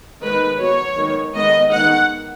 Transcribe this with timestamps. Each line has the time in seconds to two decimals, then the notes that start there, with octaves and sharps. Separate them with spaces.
0.21 D#3 G#3 B3 B4
0.59 F#3 B3 C#5
0.97 D#3 G#3 B3
1.34 D#3 G#3 B3 D#5
1.71 D#3 G#3 B3 F#5